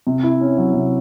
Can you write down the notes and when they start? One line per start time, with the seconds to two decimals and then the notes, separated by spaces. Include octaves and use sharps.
0.07 C3
0.23 E4
0.41 C#4
0.58 F#3
0.74 C3